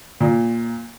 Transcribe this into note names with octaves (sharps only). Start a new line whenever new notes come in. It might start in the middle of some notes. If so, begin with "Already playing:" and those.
A#2